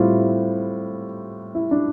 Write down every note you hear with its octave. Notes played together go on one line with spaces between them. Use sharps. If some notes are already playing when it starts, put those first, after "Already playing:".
Already playing: A2 G3 C4 E4 F4
E4
D4